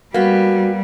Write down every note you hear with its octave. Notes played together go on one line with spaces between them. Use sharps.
G3 A#3 B3 F#4